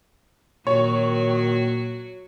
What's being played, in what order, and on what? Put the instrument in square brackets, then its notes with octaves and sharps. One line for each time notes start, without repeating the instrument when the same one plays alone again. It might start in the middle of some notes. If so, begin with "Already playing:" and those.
[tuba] A#2 [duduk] D#3 [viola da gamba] F#3 F#4 [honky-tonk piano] C#5